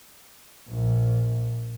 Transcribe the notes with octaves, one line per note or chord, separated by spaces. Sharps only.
A#1